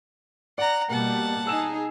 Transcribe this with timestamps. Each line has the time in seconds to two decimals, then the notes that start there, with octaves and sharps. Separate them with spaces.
0.58 D5 F#5 A#5
0.89 B2 G3 A#3 F#5 A5
1.47 D#4 G#4 E6 E7